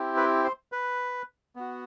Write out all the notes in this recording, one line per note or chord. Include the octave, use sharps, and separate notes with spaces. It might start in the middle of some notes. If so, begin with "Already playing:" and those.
Already playing: C4 E4 G4
B4
C5
B4
B3 F#4